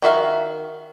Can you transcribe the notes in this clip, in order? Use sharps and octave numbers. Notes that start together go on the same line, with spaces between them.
D#3 F#4 E5 F5